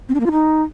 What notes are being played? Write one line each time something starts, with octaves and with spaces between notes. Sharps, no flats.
C4
D4
A#3
F4
D#4